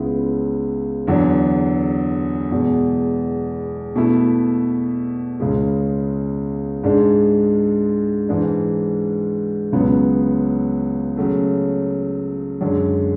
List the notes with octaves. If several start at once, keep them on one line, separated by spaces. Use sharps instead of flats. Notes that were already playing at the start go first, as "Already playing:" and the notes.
Already playing: C#2 C#3 G#3 B3 E4
E2 D3 F#3
E2 B2 G#3
B2 A3 E4
C#2 C#3 G#3
G#2 G#3 D4
G#2 E3 G#3 D4
C#2 C#3 F#3 B3
C#3 F#3 A3
F#2 D3 G#3